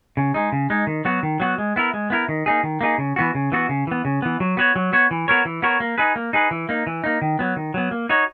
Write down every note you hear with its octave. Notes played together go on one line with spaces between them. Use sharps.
C#3
G#3 D#4
C#3
G#3 D#4
D#3
F#3 B3 F#4
D#3
F#3 B3 F#4
G#3
B3 E4 A#4
G#3
B3 E4 A#4
D#3
A#3 D#4 G#4
D#3
A#3 D#4 G#4
C#3
E3 B3 F#4
C#3
E3 B3 F#4
C#3
E3 B3
C#3
E3 B3
F#3
B3 F#4 C#5
F#3
B3 F#4 C#5
E3
B3 F#4 A#4 C#5
E3
B3 F#4 A#4 C#5
A#3
D#4 G#4 B4
A#3
D#4 G#4 B4
E3
A#3 D#4
E3
A#3 D#4
D#3
F#3 B3
D#3
F#3 B3
A#3
D#4 F#4 C#5